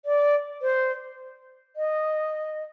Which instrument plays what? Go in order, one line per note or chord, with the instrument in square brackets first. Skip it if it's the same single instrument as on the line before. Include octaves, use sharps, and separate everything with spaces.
[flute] D5
C5
D#5